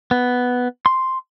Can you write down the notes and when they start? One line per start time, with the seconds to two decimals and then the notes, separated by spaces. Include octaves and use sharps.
0.11 B3
0.86 C6